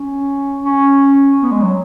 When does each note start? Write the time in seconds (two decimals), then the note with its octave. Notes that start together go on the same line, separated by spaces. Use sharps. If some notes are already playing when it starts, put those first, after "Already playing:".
Already playing: C#4
0.64 C#4
1.42 B3
1.51 G#3
1.62 F#3